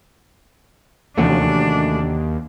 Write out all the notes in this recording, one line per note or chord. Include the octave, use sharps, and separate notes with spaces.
D#2 C3 E3 F3 A3 C#4 D4 F#4